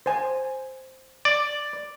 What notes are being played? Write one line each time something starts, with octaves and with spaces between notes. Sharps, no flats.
C5 G#5
D5